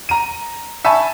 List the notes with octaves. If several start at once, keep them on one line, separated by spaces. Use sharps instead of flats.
A#5 D#7
E5 G#5 A5 B5 C#6